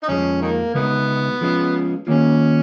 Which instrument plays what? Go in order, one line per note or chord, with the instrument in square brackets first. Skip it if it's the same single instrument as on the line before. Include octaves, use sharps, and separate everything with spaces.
[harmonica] D#4
[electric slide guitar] F2 F3 G#3 [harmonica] C#4
[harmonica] D#3 A#3
[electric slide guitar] C#3 G#3 D#4 F#4 [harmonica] B3
[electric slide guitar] F3 G#3 C#4 F4
[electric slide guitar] D#3 A#3 F4 [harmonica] C#4